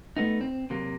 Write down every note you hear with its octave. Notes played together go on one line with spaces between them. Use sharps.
A3 B3 D#4
C4
C3 F#3 A#3